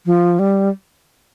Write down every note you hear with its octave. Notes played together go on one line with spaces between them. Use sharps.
F3
G3